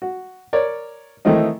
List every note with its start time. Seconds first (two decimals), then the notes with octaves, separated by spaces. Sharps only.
0.02 F#4
0.53 A#4 C#5 D5
1.25 D#3 E3 A3 C4 D#4